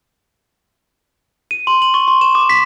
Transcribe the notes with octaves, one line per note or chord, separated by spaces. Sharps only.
D#7
C6
F#7
C#6
C6
E7
D6
B6